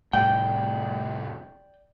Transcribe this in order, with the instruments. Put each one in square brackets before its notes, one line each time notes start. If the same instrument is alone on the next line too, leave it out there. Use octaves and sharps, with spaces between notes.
[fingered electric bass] F1 A2 G3 [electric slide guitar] D5 G5